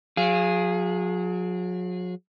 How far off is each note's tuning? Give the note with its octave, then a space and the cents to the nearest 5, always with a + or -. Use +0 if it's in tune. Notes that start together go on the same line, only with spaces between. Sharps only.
F#3 -40 G#4 +0 F5 -10